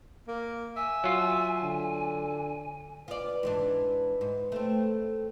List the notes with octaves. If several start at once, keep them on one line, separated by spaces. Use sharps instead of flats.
A#3
E5 G#5
F#3 F4
D3
F4 B4 D5
G#2 E3 D4
G#2
A3 C4